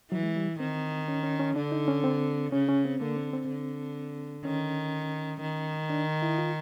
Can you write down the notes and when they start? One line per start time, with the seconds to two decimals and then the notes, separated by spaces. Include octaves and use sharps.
0.11 E3 F#3
0.23 G#3
0.36 G3
0.59 D#3 C4
1.08 C#4
1.23 C#4
1.39 C#4
1.56 D3 D4
1.72 D#4
1.88 C#4
2.04 C4
2.52 C#3 C#4
2.69 C#4
2.85 C4
3.01 D3 A#3
3.17 C4
3.33 C4
3.49 D3
4.45 D#3 C#4
5.41 D#3
5.90 D4
6.22 E4
6.38 F4